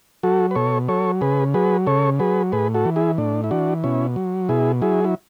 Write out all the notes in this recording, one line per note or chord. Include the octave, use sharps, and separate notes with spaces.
F#3 F#4 A4
B4
B2 A4 C#5
F#3 A4 C#5
C#3 G#4 B4
F#3 G#4 B4
C#3 A4 C#5
F#3 G#4 B4
A2 G#4 B4
F#4 A4
E3
E4 G#4
A2 D4
E4
E3 D4 F#4
B2 C#4 E4
F#3
B2 E4 G#4
F#3 E4 G#4
E4